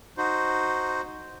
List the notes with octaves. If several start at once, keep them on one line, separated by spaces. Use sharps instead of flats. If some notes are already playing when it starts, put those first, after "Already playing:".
D#4 F#4 C5